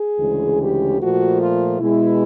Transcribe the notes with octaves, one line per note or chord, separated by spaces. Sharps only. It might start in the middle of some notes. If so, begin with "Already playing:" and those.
Already playing: G#4
D2 C#3 E3 G#3
G4
A#2 F3 A3 F#4
F4
B2 G#3 E4